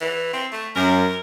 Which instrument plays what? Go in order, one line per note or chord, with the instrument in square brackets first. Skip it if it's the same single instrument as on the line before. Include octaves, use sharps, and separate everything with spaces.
[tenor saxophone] E3
C4
A3
[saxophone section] F#2 [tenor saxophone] A#4